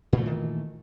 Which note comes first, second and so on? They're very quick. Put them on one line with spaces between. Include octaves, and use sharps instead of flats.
A#2 A3 E3 D#3